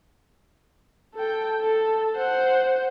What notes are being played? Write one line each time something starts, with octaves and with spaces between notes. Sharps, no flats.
A4 G5
A4
C5 F#5